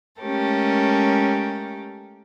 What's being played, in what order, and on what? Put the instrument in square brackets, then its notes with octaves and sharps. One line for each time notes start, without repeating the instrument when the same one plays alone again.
[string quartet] G#3 A3 C#4 G4 A4 A#4